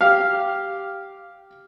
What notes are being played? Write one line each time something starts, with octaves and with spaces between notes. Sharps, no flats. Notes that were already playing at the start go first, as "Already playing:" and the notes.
G4 F5